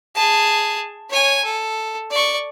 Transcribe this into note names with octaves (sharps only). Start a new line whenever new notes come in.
G#4 A5
C#5 G#5
A4
D5 C#6